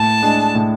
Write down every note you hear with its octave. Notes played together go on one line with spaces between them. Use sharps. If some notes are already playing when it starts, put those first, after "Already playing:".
Already playing: A2 A5
G#3 D4
A2